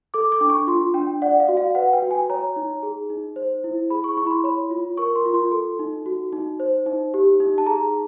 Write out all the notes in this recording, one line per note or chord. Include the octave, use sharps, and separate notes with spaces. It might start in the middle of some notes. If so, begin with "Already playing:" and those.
A4 D6
D6
D4
C#6
F4 C6
D4 G5
D5 F#5
F5
F#4
F5
B4 F#5
G5
F#4
G#5
C#5 A#5
D#4
G#4
D#4
C5
E4
G#4 B5
C#6
E4 C#6
B5
C6
C#5 B5
F4
A#4 C#6
C6
F4
C6
A4
D#4
F#4
D#4
C5
D#4
G4
D#4
A5
G#4 A#5